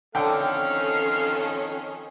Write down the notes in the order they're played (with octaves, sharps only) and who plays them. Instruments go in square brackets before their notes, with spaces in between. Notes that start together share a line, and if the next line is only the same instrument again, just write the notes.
[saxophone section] F2 D#3 C#4 [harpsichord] D3 G5 [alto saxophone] A4 [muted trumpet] F5